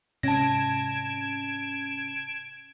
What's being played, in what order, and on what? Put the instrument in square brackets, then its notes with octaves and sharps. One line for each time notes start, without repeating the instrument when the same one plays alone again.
[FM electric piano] G#2 C3 C#4 [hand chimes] A5 A#6 [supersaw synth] G#6 D7 E7